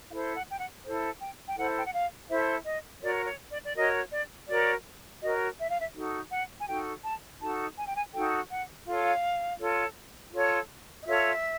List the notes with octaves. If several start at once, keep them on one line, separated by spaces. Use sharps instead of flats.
E4 A4 C5 F5
F#5
G5
F#5
E4 A4 C5
G5
G5
E4 A4 C5 F#5
G5
F#5
F5
E4 A4 C5 E5
D#5
F#4 A#4 C#5 D5
C#5
D5
D5
F#4 A#4 C#5 D#5
D5
F#4 A#4 C#5 D5
F#4 A#4 C#5 D#5
E5
F5
E5
D#4 F#4 A4
F#5
G#5
D#4 F#4 A4 G5
A5
D#4 F#4 A4 A5
G#5
G5
G#5
D#4 F#4 A4 G5
F#5
F4 A4 C#5 F5
F4 A4 C#5
F4 A4 C#5
D#5
F4 A4 C#5 E5